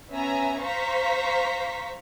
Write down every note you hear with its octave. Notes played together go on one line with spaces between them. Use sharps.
B3 C#4 E5 G#5 A#5
C5 F5 A#5 C#6 B6